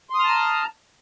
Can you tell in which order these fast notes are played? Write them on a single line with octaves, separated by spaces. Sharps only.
C6 D#6 F6 A5 A#5